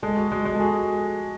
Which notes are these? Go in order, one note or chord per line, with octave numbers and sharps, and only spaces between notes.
G#3 A4
F#4
G#3
G#3
A4
F#4 G#4